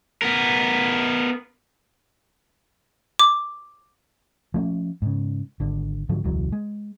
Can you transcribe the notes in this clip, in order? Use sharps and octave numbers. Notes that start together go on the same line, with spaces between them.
B3 A#4
D6
F3 A3 B3 C#4
G#2 C#3
G#1 D3
G#2 D3 F3 F#3
E1 C#2 E3 F#3
G#3